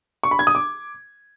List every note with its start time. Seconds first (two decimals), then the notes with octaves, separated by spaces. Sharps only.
0.23 C#6
0.31 B5
0.39 G#6
0.47 D#6
0.55 D6